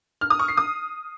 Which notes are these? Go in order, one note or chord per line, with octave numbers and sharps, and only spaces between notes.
F6
D#6
C#6
C7
D#6